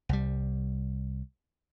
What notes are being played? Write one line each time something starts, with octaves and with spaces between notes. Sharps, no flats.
C2 G3